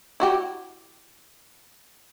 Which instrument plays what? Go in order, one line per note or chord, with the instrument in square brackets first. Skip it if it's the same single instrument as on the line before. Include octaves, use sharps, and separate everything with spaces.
[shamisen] E4 F#4 G4